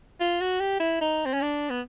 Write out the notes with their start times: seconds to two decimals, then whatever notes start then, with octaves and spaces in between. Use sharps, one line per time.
0.20 F4
0.41 F#4
0.60 G4
0.80 E4
1.01 D#4
1.25 C4
1.33 C#4
1.41 D4
1.70 B3